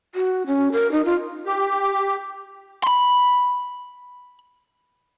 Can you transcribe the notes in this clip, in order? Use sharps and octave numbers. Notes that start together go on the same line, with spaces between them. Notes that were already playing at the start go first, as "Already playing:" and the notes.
F#4
C#4
A#4
D#4
F4
G4
B5 C6